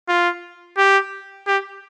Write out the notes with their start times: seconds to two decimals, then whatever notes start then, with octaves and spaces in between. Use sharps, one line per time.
0.09 F4
0.78 G4
1.47 G4